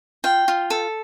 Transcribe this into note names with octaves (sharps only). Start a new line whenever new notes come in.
F4 G5
F4
A4